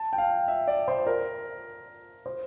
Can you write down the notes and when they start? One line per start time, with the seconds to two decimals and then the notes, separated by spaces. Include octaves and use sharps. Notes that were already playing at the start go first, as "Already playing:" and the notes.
Already playing: A5
0.13 G5
0.18 F5
0.48 E5
0.67 D5
0.88 C5
1.07 A#4
2.26 C5